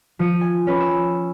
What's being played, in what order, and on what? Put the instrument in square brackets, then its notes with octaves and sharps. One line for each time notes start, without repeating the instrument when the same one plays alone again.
[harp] F3 C#7 D#7
G#5
C#4 B4
E6